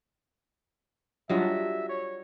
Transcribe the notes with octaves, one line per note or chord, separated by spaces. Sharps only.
F#3 G3 D4 F4 D#5 E5
C#5